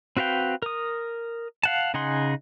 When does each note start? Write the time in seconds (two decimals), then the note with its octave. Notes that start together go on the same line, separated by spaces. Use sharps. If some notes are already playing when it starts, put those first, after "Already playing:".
0.17 C4 F#4 B4 F5 G5
0.62 A#4 D#6
1.63 F5 F#5 A5
1.94 C#3 D#4 G#4 F#5 C6